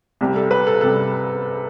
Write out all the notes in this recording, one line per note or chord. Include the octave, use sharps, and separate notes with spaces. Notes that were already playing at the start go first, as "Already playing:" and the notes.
C2 C3 G3
A4
B4
A4
C3 G3 A4